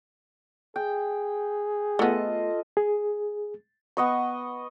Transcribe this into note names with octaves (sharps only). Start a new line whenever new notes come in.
G#4 G5
A3 B3 F4 A4 D#5
G#4
B3 D#5 C#6